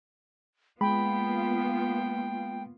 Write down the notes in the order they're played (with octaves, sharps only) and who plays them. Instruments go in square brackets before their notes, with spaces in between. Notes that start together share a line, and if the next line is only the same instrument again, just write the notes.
[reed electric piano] G#3 B5 [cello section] A#3 B3 F4 [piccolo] G5